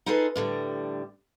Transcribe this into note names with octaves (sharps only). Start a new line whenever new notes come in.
D#4 F4 G#4 A4 B4
A2 D3 G3